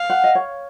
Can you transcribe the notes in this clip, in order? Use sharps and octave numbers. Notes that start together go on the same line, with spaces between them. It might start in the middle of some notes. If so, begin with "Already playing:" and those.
Already playing: F5
F#5
D#5
C#5